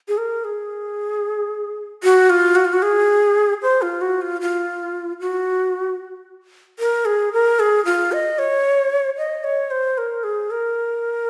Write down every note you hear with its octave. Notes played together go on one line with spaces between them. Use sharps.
G#4
A#4
G#4
F#4
F4
F#4
F4
F#4
G#4
C5
F4
F#4
F4
F4
F#4
A#4
G#4
A#4
G#4
F4
D#5
C#5
D#5
C#5
C5
A#4
G#4
A#4